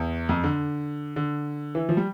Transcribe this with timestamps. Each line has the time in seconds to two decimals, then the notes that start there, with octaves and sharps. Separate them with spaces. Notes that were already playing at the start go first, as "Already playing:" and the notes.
Already playing: E2
0.29 F2
0.44 D3
1.16 D3
1.75 E3
1.89 F3
1.97 G3